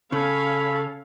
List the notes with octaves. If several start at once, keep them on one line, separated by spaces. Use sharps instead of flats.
C#3 C#4 A4 C#5 F5 B5